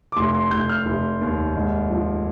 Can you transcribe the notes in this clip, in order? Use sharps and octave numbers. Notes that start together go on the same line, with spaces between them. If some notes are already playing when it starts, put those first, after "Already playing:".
D6
F1 C6
C6
F1 G6
F6
F1
D#2
G#2
F3